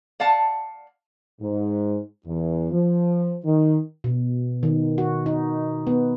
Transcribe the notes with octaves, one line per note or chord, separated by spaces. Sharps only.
D5 F5 F#5 A5
G#2
E2
F3
D#3
B2
D#3
F#4
D#4
B3